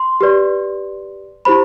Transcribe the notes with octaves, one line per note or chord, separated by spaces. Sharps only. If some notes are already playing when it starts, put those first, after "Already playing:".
Already playing: C6
G4 B4 D5
E4 G4 C5 B5